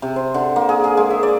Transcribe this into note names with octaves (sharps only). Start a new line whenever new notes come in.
C3
C5
D3
A#3
G#4
G#4
G#3
E5
D5